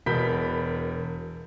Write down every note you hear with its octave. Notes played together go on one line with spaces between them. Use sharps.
E1 B2 A#4 B5 G6 B6